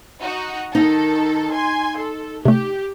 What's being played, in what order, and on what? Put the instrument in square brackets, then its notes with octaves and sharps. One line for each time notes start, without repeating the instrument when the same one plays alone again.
[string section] D#4 F#4
[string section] D#3 A4 [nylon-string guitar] D#4
[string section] G#5 C6
A4
[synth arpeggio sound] C3 A3 [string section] G4